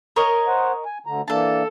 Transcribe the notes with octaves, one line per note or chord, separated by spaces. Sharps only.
A#4 C#5 D#5
C5 F#5
G#5
D2 D3 A#5
E3 A#3 D4 A4 A5